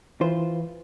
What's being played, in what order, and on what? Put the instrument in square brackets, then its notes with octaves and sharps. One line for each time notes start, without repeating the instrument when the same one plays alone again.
[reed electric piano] E3 B4 [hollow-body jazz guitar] F4 C5